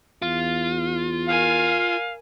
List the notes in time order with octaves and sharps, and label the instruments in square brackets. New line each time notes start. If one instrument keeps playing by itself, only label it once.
[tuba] E2 [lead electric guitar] F4
[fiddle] A#4 G#5 [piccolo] F5